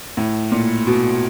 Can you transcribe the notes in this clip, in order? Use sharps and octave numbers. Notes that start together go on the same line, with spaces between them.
A2
A#2
B2